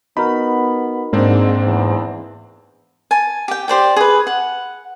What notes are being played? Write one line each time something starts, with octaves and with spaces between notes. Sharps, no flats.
B3 D#4 F#4 A#4 B5
G#2 A#3 C4 D4
E2
G#5 A5
G4 G5
G4 C5 D5 G5
G#4 B4
F#5